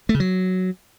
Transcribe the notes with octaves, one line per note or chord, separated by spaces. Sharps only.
A3
C#3
F#3